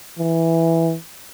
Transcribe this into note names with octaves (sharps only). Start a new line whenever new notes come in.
E3